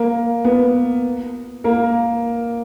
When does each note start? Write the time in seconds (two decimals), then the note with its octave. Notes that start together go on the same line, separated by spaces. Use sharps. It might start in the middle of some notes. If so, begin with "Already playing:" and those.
Already playing: A#3 A#4
0.45 B3 B4
1.64 A#3 A#4